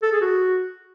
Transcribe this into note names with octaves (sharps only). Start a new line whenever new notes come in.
A4
G#4
F#4